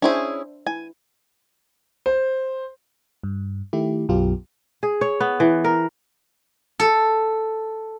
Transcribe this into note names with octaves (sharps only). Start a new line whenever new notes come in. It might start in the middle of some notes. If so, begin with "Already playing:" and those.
C#4 D4 E4 G#4 C5 E5
E4 G#5
C5
G2
D#3 A3 E4 G4
B1 F#2 F#3 B3 F4 G4
G#4
C#5
B3
E3
A#4
A4